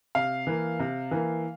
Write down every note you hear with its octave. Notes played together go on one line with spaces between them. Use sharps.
C3 F5
E3 A#3
C3
E3 A#3